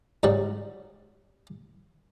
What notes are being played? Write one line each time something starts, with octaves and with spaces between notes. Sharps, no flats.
G#2 C#3 F#3 G3